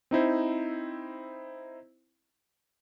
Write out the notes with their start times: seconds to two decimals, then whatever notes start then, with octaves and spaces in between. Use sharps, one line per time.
0.11 C4 D#4 E4 C5